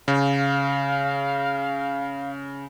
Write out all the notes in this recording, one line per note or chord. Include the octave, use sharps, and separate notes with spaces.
C#3 F5